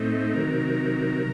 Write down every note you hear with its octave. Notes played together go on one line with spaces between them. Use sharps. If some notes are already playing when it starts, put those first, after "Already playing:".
Already playing: A2 A3 C4 D#4
C3 D#3 F#3 A#4